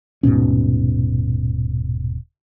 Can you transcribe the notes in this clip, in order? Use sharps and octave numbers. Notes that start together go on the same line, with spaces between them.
D#1 G#2 B2 C#4